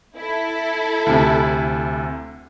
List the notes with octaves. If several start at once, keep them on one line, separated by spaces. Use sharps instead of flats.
E4 A4
D2 C3